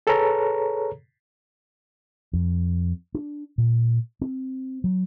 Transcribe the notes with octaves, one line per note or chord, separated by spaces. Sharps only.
G#4 A4 B4 C#5 A#5
F2
D4
A#2
C4
F#3